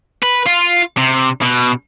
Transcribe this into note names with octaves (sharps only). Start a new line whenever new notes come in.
B4
F4
C3
B2